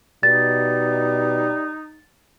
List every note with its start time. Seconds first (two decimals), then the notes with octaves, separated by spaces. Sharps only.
0.23 B2 G3 D#4 A6